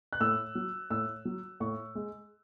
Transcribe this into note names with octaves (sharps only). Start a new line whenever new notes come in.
F#6
A2 E6
F#3
A2 E6
F#3
A2 C#6
G#3